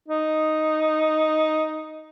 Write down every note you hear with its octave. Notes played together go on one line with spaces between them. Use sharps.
D#4